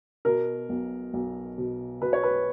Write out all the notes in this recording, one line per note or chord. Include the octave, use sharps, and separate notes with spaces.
B2 A#4
B1
B1
B2
B2 B4
C#5
B4